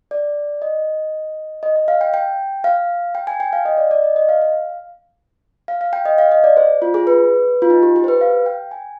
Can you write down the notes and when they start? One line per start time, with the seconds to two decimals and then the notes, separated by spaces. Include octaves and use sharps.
0.11 D5
0.62 D#5
1.63 D#5
1.76 D#5
1.88 F5
2.01 G5
2.14 G5
2.64 F5
3.15 G5
3.27 G#5
3.40 G5
3.53 F5
3.65 D#5
3.77 D5
3.91 D5
4.04 D#5
4.16 D#5
4.29 F5
4.42 F5
5.68 F5
5.81 F5
5.93 G5
6.05 D#5
6.18 F5
6.32 D#5
6.44 D5
6.57 C5
6.82 F4
6.94 G#4
7.07 B4
7.62 F4
7.70 D#4
7.83 G4
7.96 G4
8.04 C5
8.08 B4
8.21 F5
8.46 G5
8.71 G#5